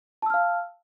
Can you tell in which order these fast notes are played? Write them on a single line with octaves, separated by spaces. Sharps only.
A5 E6 F6 F5